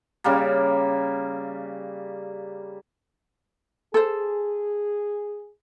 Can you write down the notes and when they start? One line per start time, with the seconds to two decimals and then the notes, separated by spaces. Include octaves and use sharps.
0.24 C#3 G3 A#3
3.94 G#4 A4 C5